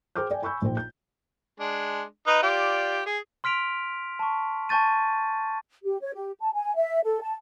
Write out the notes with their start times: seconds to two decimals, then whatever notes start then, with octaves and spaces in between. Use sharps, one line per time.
0.16 G#4 C5 G5 D6 F6 G6
0.31 D5 G5 G#5
0.42 G#5 B5 C#6 E6 G6
0.62 A#1 D#4 C5 G5
0.77 G6
1.60 G#3 D4
2.27 D#4 B4 D#5
2.43 F4 G4 D5
3.06 G#4
3.44 C6 F6 B6 D7 F7
4.19 A5 C#6
4.69 G#5 A5 C#6 G6 A6 D#7
5.84 G4
6.01 C#5
6.15 G4
6.40 A5
6.54 G#5
6.75 E5
7.04 A4
7.21 A5